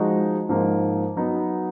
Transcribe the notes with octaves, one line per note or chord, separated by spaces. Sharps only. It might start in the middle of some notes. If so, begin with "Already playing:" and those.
Already playing: F3 G#3 D#4 F#4
G#2 F3 A#3 D#4
F#3 B3 D#4